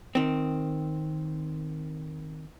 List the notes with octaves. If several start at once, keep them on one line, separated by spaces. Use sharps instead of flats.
D#3 C4